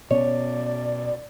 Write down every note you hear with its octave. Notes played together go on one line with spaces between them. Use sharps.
B2 B3 C#4 C#5 D5